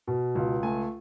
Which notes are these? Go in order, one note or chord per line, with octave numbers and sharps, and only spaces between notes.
B2
C#2
A3 G#5